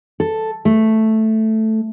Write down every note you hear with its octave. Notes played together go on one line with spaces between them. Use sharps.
A4
A3